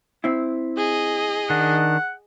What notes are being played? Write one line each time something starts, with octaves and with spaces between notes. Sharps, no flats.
C4 E4
G#4 D#5
D#3 D4 F#5